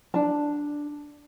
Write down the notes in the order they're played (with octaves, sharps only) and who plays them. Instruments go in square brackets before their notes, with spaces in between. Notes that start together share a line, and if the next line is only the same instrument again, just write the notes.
[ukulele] D4 A5